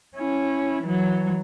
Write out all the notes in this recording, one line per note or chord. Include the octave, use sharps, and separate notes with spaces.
C#4 E4
E3 F#3